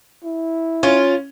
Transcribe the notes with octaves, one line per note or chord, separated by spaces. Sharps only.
E4
C#4 F4